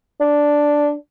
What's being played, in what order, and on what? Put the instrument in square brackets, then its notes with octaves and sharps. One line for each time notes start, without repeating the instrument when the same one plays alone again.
[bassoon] D4